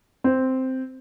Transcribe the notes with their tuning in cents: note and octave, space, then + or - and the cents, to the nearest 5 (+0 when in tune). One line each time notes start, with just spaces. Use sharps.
C4 -5